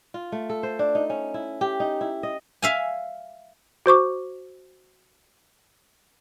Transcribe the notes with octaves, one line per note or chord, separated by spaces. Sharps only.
F4
A3
A4
C5
D4
D#4
C#4
E4
G4
D#4
E4
D#5
E5 F5 G#5
F#4 C5 C#6 D6